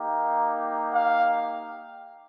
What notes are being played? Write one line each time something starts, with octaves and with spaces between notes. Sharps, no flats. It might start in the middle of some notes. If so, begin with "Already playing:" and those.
Already playing: A#3 D#4 G4
F5